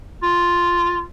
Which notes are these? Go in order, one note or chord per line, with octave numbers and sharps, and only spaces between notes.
F4